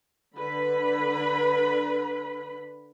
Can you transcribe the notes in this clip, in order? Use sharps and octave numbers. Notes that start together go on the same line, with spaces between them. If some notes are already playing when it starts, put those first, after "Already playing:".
D3 B4 B5